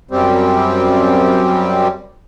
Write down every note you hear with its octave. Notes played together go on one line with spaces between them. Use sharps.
F#2 G3 C4